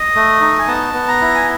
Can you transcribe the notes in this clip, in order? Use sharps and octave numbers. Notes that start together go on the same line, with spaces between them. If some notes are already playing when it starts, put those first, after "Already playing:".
Already playing: D#5
A3
D#4
G#5
B3 A5
B3
A#5
E4
G#5